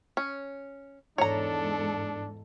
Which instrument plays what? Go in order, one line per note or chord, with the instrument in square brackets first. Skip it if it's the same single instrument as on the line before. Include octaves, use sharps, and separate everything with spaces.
[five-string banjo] C#4
[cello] E2 A4 [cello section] G#2 [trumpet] D4 [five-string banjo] C#5 A#5